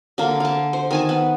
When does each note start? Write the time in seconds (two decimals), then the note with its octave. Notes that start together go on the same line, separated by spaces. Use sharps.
0.18 D3 A#3
0.40 F5 A5
0.73 C5
0.91 D#3 G#5 A5
1.09 B3